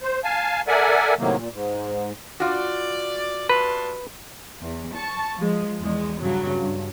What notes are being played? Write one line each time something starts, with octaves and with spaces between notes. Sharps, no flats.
C5
F5 G#5 A5
A4 A#4 D5 E5 F#5 G#5
A2 C3 D#3 F#3 A#3
A#2
G#2
F4 F#4 D5
G2 B4 A5 C6
E2
A5 C#6
F3 G#3
E2 G#3
G2 C#3 F#3
G2